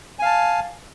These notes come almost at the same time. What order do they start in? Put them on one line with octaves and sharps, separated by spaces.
G#5 F5 A5